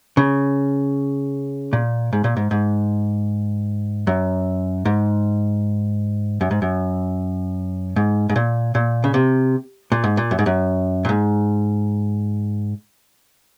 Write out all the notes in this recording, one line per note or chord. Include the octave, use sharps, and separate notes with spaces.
C#3
A#2
G#2
A#2
G#2
G#2
F#2
G#2
F#2
G#2
F#2
G#2
G#2
A#2
A#2
C#3
C3
A#2
G#2
A#2
F#2
G#2
F#2
A#2
G#2